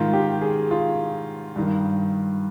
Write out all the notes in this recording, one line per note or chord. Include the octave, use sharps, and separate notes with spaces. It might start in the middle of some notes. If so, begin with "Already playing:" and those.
Already playing: G#2 D#3 F4
G4
G#4
F4
G2 D#3